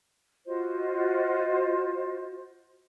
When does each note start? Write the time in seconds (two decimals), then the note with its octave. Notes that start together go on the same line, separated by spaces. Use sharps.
0.46 F4 F#4 C5 D#5